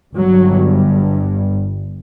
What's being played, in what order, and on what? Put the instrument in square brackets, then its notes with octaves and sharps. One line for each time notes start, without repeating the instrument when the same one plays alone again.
[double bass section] G1 G2 F#3